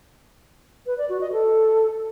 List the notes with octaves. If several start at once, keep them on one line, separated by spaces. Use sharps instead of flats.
B4
D5
F#4
D#5
A4